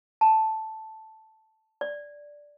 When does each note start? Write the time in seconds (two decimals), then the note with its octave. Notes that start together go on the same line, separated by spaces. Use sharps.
0.21 A5
1.81 D5